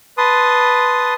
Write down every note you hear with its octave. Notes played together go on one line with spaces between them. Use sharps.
B4 A5 C6 D#6